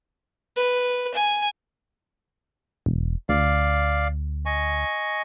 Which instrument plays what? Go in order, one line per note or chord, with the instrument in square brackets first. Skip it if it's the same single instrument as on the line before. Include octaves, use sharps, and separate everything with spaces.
[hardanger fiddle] B4
G#5
[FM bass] E1
[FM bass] D2 [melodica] D5 F5
[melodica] D#5 G#5 C#6